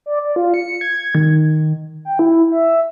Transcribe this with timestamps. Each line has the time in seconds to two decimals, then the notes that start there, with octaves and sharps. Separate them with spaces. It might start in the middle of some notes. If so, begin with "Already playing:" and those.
0.06 D5
0.24 D5
0.36 F4
0.54 C#7
0.81 G#6
1.15 D#3
2.05 G5
2.19 E4
2.51 E5